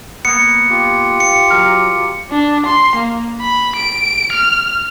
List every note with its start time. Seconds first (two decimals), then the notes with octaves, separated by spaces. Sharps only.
0.25 A#3 B3 C#7
0.70 F4 G4
1.20 C#7
1.50 F#3 A#4 F5
2.31 D4
2.67 C6
2.96 A#3
3.41 B5
3.76 D7
4.33 F6